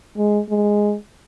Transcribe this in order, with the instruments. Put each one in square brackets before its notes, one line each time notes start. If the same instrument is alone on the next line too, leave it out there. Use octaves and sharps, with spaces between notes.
[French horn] G#3
G#3